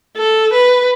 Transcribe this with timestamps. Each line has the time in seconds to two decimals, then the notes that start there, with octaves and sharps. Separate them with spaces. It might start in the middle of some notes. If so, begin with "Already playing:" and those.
0.17 A4
0.53 B4